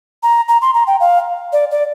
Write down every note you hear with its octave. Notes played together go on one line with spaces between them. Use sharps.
A#5
A#5
C6
A#5
G5
F5
D5
D5